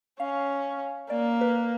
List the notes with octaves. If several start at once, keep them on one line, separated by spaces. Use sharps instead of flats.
C#4 F5
A#3 D5
B4